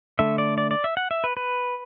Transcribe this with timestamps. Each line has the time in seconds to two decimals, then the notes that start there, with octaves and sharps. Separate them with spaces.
0.19 D3 A3 E5
0.38 D5
0.58 D5
0.71 D5
0.84 E5
0.97 F#5
1.11 E5
1.24 B4
1.37 B4